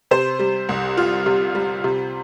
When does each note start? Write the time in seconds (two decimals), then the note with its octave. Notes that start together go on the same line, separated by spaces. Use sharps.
0.11 C3 C5
0.39 G3
0.69 C2
0.97 F4
1.26 C3
1.55 G3
1.84 C3